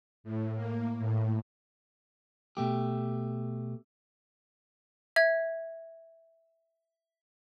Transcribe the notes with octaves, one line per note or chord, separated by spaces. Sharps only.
A2
A#3
A2
B2 A3 G4
E5 G#6